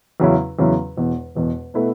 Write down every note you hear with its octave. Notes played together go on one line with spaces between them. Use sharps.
E2 C#3 F#3 C#4 E4
E2 C#3 F#3 C#4 E4
E1 E2 B2
E1 E2 B2
B2 A3 E4 B4